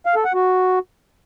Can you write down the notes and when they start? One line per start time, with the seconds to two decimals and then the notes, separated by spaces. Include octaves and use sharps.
0.06 F5
0.15 A4
0.25 F#5
0.34 F#4